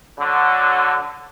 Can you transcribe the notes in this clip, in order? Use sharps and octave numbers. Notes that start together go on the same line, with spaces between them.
D3 F#3